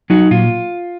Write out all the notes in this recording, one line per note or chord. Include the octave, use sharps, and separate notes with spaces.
F#3 D#4 F#4
A#2 F4